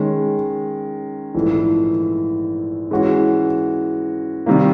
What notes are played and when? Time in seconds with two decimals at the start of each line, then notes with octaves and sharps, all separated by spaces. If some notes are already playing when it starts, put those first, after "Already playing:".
Already playing: D#3 G#3 C#4
1.35 A#1 G#2 E3 A3
2.91 E3 G#3 C#4 F#4
4.46 C3 D#3 G3 A#3